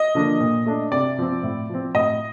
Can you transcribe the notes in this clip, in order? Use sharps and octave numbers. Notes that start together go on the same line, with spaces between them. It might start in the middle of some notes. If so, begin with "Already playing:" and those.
Already playing: D#5
D3 F3 A#3 D4
A#2
A3 D4
C3 D5
F3 C4
A2
F3 C4
A2 D#5